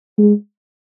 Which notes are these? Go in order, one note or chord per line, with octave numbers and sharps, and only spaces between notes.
G#3